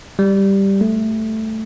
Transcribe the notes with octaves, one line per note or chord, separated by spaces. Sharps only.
G3
A3